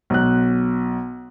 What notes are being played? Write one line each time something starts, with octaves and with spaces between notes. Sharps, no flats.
B1 F#6